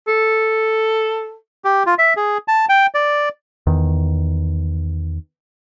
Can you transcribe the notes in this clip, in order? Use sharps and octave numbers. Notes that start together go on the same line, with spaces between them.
A4
G4
F4
E5
G#4
A5
G5
D5
E2 D#3